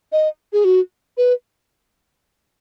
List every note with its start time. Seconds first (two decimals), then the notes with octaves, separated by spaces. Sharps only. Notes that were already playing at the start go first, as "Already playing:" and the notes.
0.12 D#5
0.53 G#4
0.64 F#4
1.17 B4